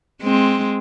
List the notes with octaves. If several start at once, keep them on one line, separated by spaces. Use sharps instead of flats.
G#3 C4